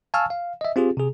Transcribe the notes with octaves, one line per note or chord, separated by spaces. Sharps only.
F5 G#5 A5 C#6 E6 F6
F5
D#5 E5
C4 F4 G4 G#4
C3 G#4